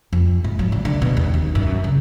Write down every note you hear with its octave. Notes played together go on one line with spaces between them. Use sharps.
F2
G#2
F#3
D3
D3
B2
D#2
D#3
F#2
C#3